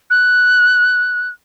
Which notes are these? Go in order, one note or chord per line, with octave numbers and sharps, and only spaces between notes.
F#6